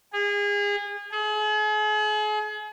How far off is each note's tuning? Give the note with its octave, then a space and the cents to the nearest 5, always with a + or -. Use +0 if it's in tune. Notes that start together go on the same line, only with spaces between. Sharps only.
G#4 -30
G#4 +40